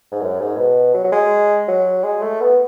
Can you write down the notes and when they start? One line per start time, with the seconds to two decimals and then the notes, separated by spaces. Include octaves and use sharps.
0.12 G#2
0.21 F#2
0.39 G#2
0.57 B2
0.94 F#3
1.04 F#3
1.12 G#3
1.68 F#3
2.04 G#3
2.22 A3
2.41 B3